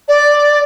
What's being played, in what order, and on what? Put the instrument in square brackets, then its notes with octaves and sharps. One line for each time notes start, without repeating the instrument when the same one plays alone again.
[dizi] D5